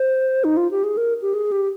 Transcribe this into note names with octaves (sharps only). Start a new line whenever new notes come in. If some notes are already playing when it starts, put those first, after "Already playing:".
Already playing: C5
D#4
F4
G4
G#4
A#4
G4
G#4
G4